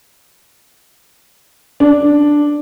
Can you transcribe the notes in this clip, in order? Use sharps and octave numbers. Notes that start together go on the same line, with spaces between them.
D4